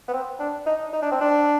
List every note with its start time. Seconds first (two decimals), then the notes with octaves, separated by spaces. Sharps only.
0.08 B3
0.13 C4
0.39 D4
0.66 D#4
0.93 D#4
1.02 D4
1.11 C4
1.21 D4